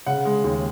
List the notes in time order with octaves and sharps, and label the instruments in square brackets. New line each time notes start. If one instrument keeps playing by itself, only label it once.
[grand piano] C#3 F#5
G#3
D#2